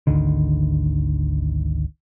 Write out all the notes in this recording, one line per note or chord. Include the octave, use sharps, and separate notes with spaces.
G#1 D2 D3 D#3